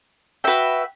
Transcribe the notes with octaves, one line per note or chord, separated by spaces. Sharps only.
F#4 B4 E5 G5